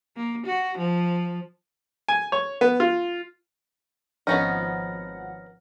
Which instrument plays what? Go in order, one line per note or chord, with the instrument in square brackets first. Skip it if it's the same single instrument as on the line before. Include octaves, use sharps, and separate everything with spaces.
[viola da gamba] A#3
F#4
F3
[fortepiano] G#5
C#5
B3
F4
[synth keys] G#1 F3 F#5 [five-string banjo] B3 C#4 D#4 [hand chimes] F6 A#6